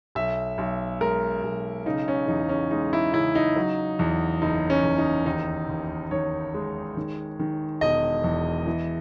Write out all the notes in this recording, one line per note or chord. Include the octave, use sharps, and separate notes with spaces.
B1 E5
B1
G#3 A#4
B1
C#3 D#4
C#4
E2 D#4
C#4
G#3 D#4
E4
C#3 E4
D#4
F#3
E2
F#1 D#4
C#4
E2
D#4
D#2 D#4
D#2
D#3 C#5
G#3
D#3
D#3
E1 D#5
E2
E3